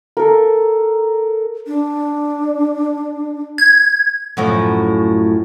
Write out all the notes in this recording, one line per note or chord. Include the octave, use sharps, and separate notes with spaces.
A4 A#4
D4
G#6
F#2 A2 F3